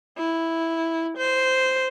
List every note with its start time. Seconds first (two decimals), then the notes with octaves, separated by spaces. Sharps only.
0.18 E4
1.18 C5